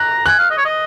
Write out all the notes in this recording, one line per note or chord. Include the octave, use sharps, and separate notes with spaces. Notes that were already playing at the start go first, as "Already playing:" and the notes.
Already playing: A#5 F#6
G#5 F#6
F5
D#5
C#5
D#5